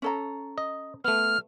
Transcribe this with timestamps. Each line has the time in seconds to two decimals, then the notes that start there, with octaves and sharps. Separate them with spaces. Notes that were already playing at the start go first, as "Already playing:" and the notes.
0.02 C#4 A4 A#5
0.58 D#5
1.04 A3 B3 F6